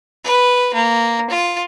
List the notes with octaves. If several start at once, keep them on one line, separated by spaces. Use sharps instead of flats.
B4
A#3
F4